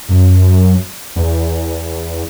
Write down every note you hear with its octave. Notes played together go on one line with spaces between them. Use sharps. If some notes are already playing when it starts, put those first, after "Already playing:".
F#2
E2